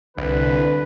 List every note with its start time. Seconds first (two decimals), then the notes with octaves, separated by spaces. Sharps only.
0.17 C2 D3 B4